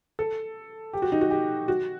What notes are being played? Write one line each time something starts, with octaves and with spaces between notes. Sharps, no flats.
A4
G4
F#4
D#4
F#4
G4
F#4